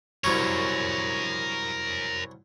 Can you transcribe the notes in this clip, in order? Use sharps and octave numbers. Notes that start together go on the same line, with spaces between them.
C2 F#2 C#4 A#4 C#5